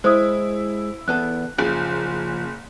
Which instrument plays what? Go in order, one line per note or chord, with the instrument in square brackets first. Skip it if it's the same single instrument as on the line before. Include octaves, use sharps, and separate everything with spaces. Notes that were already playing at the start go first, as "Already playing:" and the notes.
[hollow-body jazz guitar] G#3 [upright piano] E4 [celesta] C5 D#6
[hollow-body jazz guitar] E2 B3 A4 [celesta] F#6
[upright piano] F#1 [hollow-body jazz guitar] C#3 F3